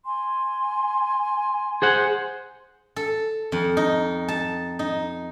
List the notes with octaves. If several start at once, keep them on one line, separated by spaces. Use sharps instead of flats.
G#5 C6
G#4 C5 F#5
A4
F2
D#4
A5
D#4